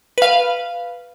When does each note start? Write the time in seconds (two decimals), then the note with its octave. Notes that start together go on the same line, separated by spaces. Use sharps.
0.18 B4 F5